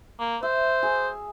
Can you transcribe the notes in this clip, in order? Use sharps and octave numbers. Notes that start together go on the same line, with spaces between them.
A#3
C5 E5
G#4